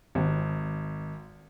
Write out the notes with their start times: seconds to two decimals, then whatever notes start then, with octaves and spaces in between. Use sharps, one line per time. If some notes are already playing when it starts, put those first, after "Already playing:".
0.15 G#1